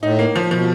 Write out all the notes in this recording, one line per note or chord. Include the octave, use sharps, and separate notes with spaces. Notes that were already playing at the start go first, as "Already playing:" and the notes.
A2 D#4
A#3
F3
B2 F3